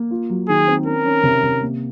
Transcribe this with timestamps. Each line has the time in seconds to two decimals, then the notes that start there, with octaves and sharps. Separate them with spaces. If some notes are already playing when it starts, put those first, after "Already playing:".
Already playing: A#3
0.11 F4
0.30 F#3
0.48 D#3 G#4
0.67 C4
0.86 C#4 A#4
1.06 C#4
1.23 C3
1.43 C3
1.62 A#3